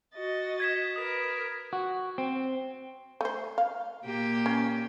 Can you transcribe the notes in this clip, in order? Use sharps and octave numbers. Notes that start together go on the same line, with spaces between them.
F#4 D#5 A6
G#6 B6 E7
A#4 B4 D#6 B6
F#4
C4
A3 C5
F5
A#2 A#3 G4
C#4